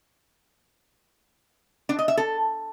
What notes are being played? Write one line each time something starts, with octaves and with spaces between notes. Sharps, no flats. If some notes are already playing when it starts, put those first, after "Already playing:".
D4
D#5
E5
A4